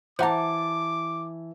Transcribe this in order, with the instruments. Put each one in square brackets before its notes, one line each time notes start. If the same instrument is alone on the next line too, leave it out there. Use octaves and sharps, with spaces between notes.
[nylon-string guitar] E3 A5 [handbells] C5 F#5 A#5 [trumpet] D6